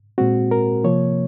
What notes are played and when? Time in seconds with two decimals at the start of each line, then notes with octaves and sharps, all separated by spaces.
0.18 A#2 G#3 C4 F#4
0.51 A#4
0.84 C3 F3 A#3 C#5